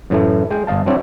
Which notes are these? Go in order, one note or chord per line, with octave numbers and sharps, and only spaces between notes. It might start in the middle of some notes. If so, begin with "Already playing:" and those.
F#2 A2 E3 A3
G#3 G5
G1 D#5 F5 A5
F#3 C4 D4 E4 C#5